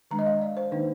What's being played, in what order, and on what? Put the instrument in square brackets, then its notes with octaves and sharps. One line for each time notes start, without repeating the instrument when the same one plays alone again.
[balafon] D#3 G#3 D4 A#5
D#5
F5
D5
C5
D#3 A#3 D4 D#4